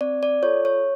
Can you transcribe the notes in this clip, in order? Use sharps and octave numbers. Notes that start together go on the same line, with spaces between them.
C4 D5
D5
F4 A4 C#5
C#5